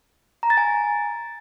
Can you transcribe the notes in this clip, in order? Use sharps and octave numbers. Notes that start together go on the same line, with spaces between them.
A#5
A6
G#5